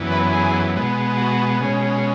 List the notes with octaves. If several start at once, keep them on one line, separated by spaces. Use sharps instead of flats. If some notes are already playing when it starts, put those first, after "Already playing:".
Already playing: F#2 E3 B3
B4
G#4
B2 G#3 B3
F#4
B2 G#3 C#4